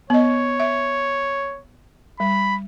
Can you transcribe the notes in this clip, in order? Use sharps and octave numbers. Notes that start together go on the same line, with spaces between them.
B3 C#5 D#5
E5
G3 B5